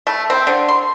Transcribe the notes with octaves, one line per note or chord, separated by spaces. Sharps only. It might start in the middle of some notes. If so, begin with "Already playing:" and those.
A3
C4
D3
C6